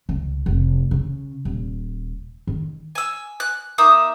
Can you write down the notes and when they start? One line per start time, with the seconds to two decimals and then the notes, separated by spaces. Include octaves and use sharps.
0.09 C#2
0.46 F1
0.91 C#3
1.45 D#1
2.47 D#3
2.95 G#5 E6
3.40 F#6
3.78 A#3 D#4 E5 D#6